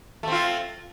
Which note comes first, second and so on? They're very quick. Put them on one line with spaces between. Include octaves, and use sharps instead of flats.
A3 C4 F4